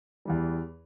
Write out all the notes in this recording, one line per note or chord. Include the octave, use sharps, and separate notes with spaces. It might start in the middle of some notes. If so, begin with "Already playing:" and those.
E2 E3 G3